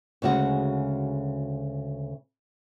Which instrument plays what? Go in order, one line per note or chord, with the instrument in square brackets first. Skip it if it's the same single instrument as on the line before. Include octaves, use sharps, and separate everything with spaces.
[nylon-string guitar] D2 C#3 G#3 F#4